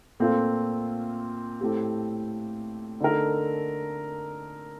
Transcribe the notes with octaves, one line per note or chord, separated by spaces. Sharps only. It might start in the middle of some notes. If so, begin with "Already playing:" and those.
A#2 A3 C4 F4
A2 A3 C4 G4
D3 A3 D#4 A#4